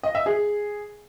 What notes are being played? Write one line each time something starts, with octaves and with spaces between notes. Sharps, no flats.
D#5
E5
G#4